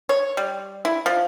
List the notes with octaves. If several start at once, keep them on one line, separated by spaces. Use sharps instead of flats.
C#5
G3
E4
F3